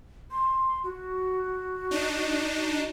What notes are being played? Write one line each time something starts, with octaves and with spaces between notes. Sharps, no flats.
C6
F#4
D4 D#4